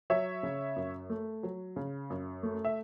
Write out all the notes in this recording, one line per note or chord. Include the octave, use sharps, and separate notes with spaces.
F#3 C#5 E5
C#3
F#2
A3
F#3
C#3
F#2
A3
E5